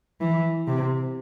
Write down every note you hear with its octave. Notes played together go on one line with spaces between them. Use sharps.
E3
C3